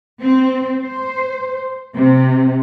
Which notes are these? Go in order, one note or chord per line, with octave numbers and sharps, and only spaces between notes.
C4
C5
C3